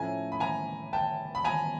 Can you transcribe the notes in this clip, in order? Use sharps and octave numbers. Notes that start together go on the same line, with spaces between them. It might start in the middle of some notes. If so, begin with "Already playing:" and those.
Already playing: A2 F3 A3 C#4 G#5 A#5
B5
G#5 A#5
G5 A5
B5
G#5 A#5